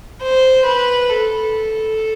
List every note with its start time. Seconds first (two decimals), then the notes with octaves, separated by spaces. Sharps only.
0.23 C5
0.66 B4
1.09 A4